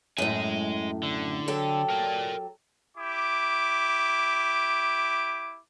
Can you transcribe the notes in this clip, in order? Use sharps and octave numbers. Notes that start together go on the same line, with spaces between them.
F#2 A2 G#3 G#5
D3
F#3 G4 A4
A#4 D5
E4 G4 D6